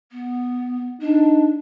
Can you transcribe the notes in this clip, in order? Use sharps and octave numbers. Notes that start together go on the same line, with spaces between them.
B3
D4 D#4